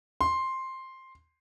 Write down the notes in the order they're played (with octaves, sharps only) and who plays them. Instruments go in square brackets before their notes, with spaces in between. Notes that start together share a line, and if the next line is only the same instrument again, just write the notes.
[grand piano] C6